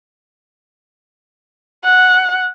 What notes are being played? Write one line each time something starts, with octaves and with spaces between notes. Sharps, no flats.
F#5